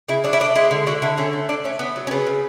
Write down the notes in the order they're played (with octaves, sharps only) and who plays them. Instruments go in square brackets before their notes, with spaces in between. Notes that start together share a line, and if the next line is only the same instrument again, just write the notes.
[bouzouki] C#3 E4
F#3 D4
E4
A3 D4
G#3 E4
D3
D3 F#4
D3 E4
A3 C#4
A3
A3 D4
A3 C#4
A3 B3
F#3
C#4
C#3 B3
C#3